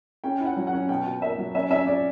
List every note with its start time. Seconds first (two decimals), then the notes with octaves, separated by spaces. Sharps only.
0.24 C#4 G5
0.40 E4
0.46 F#5
0.57 F#3
0.67 F#5
0.73 C#4
0.89 B2 G5
1.06 B2
1.22 A#3 E5
1.38 F#3
1.55 C#4 E5
1.70 C#4 E5
1.87 C#4 D5